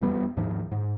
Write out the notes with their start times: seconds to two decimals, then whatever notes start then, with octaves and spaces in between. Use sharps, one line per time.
0.01 E1 F2 G3 B3
0.37 D#2 G#2 D#3 F3
0.71 G#2